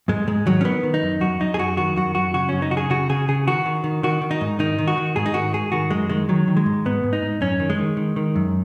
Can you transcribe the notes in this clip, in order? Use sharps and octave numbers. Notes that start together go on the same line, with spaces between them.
G#2 G#3
G#2 G#3
D#3 F#3
C#4
D#3 B3
D#3
D#4
F#2
F#2 F#4
F#2 D#4
G#4
F#2 F#4
D#3 F#4
F#2 F#4
F#2 F#4
C#3 F#4
F#2 C#4
D#4
C#3 F#4
G#4
C#3 F#4
C#3 G#4
C#3 G#4
D#3 F#4
D#3
D#3
D#3 F#4
D#3
D#4
G#2
D#3 D#4
D#3
F#4
D#3
G#2 G#4
D#4
D#3 F#4
G#2 G#4
D#3 F#4
F#2 G#3
D#3 G#3
D#3 F#3
D#3
G#3
G#2
G#2 B3
G#2
D#4
G#2
F#2 C#4
D#3
G#3
D#3
D#3
D#3
F#2